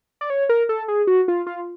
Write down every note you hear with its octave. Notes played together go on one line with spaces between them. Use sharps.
D5
C#5
A#4
A4
G#4
F#4
F4
F4